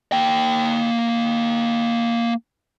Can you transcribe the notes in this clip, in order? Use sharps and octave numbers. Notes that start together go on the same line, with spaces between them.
A#3 G5